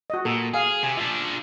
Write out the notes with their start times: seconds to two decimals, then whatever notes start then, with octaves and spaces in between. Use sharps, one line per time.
0.10 F#4 D#5
0.25 A#2 A4
0.54 G#4 F5 G#5
0.83 C3 G#5
0.97 F3 D4 E5